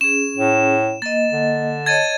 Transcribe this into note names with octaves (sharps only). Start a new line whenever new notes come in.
C#4 G#4 E7
A2
A#3 D#5 A6
D3
C#5 D#5 A5 G#6 A6 D#7